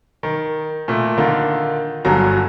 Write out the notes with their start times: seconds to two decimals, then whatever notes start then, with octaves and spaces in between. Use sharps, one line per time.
0.23 D#3
0.88 A#2 A3
1.18 D3 D#3 F4
2.05 G1 G2 D3 F#3 A#5